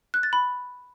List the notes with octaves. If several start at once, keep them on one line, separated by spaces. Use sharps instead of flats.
F#6
A6
B5